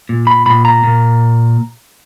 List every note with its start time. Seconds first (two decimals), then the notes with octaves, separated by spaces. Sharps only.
0.09 A#2
0.27 B5
0.46 A#2 B5
0.65 A#5
0.84 A#2